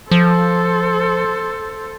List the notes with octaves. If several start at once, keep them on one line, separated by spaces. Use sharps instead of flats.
F3 A4 C5